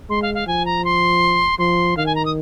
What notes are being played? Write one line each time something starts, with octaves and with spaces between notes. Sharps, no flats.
G#3 C6
F5
F5
F3 G#5
A#5
C6
F3 C6
D#3 F5
G#5
A#5
D#6